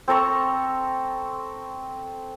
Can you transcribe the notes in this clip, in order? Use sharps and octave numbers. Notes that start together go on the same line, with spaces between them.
C4 A4 A#5 C#6